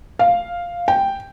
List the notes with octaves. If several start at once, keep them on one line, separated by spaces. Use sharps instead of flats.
F5
G5